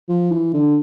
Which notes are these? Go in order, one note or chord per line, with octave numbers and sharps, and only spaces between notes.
F3
E3
D3